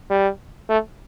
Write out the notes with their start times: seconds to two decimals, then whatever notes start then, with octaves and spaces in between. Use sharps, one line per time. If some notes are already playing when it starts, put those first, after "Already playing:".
0.10 G3
0.69 A3